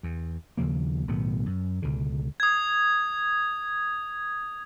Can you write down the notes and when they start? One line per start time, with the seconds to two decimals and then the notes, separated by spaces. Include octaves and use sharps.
0.03 E2
0.57 D#2 C#3 F3 A#3
1.08 B1 A2 D#3 B3
1.46 F#2
1.82 C#2 B2 D3
2.40 D#6 G#6